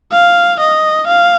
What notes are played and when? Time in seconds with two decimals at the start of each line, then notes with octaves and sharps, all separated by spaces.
0.12 F5
0.61 D#5
1.08 F5